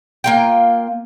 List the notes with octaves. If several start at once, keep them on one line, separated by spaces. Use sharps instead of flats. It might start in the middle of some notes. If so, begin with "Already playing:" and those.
A#3 F4 G5